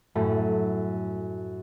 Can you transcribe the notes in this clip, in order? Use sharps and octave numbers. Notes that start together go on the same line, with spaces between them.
F#2 A2 A3